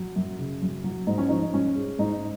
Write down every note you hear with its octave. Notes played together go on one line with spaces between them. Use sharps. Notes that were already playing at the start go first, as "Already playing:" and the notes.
Already playing: F#3
F#2
C#3
F#2
F#3
G#2 D#4
C#4
F3 D#4
G#2 C#4
G#3
G#2 D#4